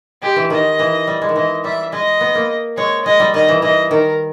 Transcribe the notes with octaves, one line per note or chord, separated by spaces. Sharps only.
G#3 G4
E3
D#3 D#5
E3
G3
G#3
D#3
E3 D#5
G3 E5
G#3 D#5
B3
A#3
G#3 C#5
G#3 D#5
G3
D#3 D#5
E3
E3 D#5
D#3 A#4